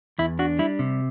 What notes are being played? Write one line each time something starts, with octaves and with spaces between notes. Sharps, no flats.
E2 E4
D4 F#4
G3 E4
C3